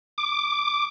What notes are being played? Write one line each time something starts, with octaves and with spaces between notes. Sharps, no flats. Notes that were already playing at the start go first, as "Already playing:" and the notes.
D6